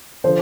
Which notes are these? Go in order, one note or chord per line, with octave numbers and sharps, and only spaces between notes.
D3 F3 C5